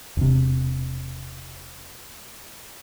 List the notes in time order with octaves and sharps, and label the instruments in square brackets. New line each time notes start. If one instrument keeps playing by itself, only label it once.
[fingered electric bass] E1 C3